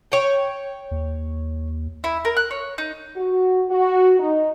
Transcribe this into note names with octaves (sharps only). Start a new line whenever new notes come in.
C#5 G5
D#2
E4
A#4
F#6
C#5
D#4
F#4
F#4
D#4